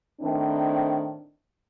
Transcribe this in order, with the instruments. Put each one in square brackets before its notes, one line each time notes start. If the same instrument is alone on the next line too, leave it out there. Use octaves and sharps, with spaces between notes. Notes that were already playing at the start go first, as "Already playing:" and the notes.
[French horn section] A2 D#3 C4 D4